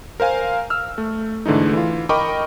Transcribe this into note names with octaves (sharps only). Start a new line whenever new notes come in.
A#4 C5 F5 G#5
E6 F6
A3
G#2 D3 E3 A3 D#4
E3 F4
A#4 D#5 G5 B5 C#6 D6